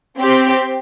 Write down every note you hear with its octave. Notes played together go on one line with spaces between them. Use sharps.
C4 G4